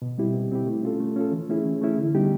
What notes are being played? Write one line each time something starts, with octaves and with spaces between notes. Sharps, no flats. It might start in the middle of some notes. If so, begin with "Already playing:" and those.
B2
G3 C4 E4 G4
B2
G3 C4 E4 G4
A3
C#4 F4 A4
A3
C#4 F4 A4
E3
A3 C#4 E4 G#4
E3
A3 C#4 E4 G#4
D3
G3 B3 D#4 G4